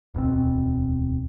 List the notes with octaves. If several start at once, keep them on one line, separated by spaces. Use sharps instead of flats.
D1 E2 B2 C4